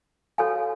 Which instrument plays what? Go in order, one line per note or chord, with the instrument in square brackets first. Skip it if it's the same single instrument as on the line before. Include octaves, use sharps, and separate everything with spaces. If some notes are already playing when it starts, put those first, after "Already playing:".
[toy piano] F#4 A4 C#5 F5 G#5